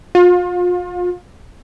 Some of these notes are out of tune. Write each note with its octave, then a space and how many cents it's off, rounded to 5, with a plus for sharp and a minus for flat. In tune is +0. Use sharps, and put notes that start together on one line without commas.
F4 +35